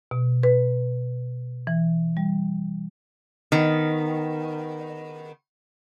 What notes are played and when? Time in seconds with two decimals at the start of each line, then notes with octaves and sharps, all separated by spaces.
0.11 B2
0.43 B4
1.67 E3
2.17 G3
3.52 D#3 B3